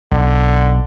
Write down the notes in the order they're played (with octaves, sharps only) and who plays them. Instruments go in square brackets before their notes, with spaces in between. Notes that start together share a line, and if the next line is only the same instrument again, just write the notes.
[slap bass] B1 [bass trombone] D3